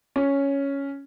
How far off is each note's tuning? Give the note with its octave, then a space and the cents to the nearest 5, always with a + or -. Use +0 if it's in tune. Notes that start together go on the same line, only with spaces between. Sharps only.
C#4 +0